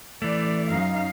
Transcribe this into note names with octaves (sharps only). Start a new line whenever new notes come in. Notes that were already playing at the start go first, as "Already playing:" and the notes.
E3 A3 D5
F#2 D#4 F5